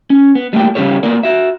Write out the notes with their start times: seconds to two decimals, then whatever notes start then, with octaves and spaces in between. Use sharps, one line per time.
0.10 C#4
0.35 B3
0.53 G3 A3 A#3 G5
0.75 C#3 G3 C#4 G4 A4 C#5
1.03 A#3 B3 A#4 D5
1.23 F#4 E5